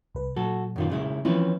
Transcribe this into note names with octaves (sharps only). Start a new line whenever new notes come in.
C2 B4
A#2 F#3 F#4 A4
F#2 D#3 F4
C#3 G#3 E4
E3 F3 C4 C#4 E4 B4